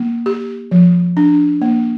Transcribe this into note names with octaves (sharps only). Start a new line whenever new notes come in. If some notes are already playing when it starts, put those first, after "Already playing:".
Already playing: A#3
G4
F3
D4
A#3